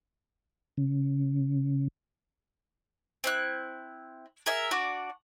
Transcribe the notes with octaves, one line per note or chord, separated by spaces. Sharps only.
C#3
C4 E4 F#6
G#4 A#4 E5
D4 F#4 D5